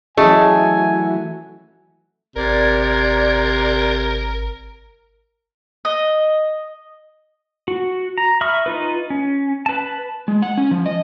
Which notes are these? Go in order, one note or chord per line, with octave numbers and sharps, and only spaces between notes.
E3 F#3 A3 C#4 G#4 D#5 G#5
G#1 C3 A#4 D5 G#6
D#5
F#4
A#5
E5 B5 C#6 D#6 F6
D#4 F4 B4
C#4
B4 A5
G#3
F#5
C#4
F3
D#5